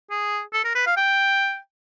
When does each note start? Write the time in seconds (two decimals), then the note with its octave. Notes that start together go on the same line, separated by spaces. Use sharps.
0.10 G#4
0.53 A4
0.64 A#4
0.75 B4
0.87 F5
0.97 G5